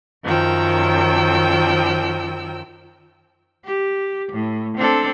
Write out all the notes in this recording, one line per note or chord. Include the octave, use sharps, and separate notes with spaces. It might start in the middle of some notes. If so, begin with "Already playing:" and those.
F#2 D#3 F3 G5 E6
G4
A2
C4 D4 A4